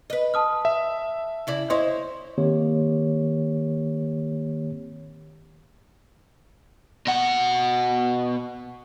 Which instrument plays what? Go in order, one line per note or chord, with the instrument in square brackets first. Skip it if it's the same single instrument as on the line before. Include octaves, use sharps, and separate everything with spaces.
[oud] B4 D#5
[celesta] A5 D#6 F6
[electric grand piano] E5
[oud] C#3 E4 D5
[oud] E4 C5 C#5 [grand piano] D#5 [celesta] C6
[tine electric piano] D#3 A#3 C4 G4 C#5
[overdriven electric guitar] B2 F#5